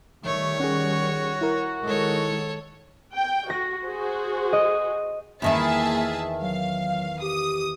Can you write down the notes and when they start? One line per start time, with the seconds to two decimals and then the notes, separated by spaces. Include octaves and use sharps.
0.25 D#3 G3 A3 C#5
0.60 C#4 F#4 G#4
1.41 E4 A#4
1.85 D#3 G#3 A4 C#5
3.13 G5
3.50 F#4 A#6
3.84 F#4 G#4 C5
4.53 D#5
5.42 E2 D#3 A#3 E4 G#4 E5 A5
6.42 F#3 F5
7.22 G4 D#6